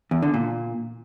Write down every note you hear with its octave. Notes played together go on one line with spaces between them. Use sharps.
E2
D3
A#2